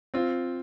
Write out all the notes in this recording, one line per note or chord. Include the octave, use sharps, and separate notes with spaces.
C4 F4